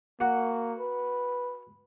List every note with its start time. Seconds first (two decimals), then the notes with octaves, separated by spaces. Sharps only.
0.20 A#3 F#4
0.80 B4